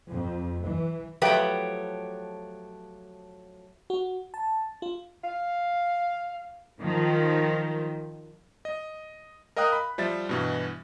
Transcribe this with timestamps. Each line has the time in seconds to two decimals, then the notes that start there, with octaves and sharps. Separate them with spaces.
0.10 F2
0.64 E3
1.22 F3 F#3 A3 G4 B4 G5
3.90 F#4
4.34 A5
4.82 F4
5.24 F5
6.80 D#3 F3
8.65 D#5
9.56 A#4 D#5 F5 G5 D#6 F#6
9.72 B5
9.98 F3 G3 E5 A6
10.29 G2 B2 E3